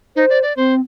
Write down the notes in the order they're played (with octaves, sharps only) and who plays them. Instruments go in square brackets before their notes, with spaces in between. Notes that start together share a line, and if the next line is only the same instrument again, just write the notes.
[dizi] D#4 [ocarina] C5
[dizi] D5
D5
[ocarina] C4 [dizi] C5